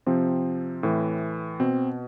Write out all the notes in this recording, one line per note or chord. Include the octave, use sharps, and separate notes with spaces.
C3 F3 C4
A2 E3
B2 C4